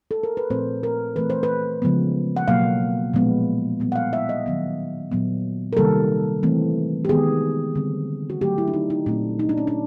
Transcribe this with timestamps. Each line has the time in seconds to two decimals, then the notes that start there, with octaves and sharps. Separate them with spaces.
0.11 A4
0.23 A#4
0.37 B4
0.50 A#2 F3 A3 C4 C5
0.83 A#4
1.16 E3 A3 C4 B4
1.30 C5
1.43 B4
1.82 C#3 F3 G#3 B3
2.36 F#5
2.48 B2 F#3 A#3 F5
3.14 A#2 F3 G#3 B3
3.80 A#2 G3 B3
3.92 F#5
3.96 F5
4.13 E5
4.29 D#5
4.46 D#3 F#3 B3
5.12 A#2 F#3 B3
5.73 A#4
5.77 C3 D#3 G3 A#3 A4
6.43 E3 A3 C4
7.05 G4
7.09 D#3 G#3 B3 G#4
7.76 D3 G3 C4
8.30 F#4
8.41 D3 F#3 A3 G4
8.58 E4
8.68 D4
8.74 D#4
8.90 D#4
9.06 A#2 F#3 A3 C4 D4
9.39 D#4
9.49 D4
9.58 C#4
9.67 D4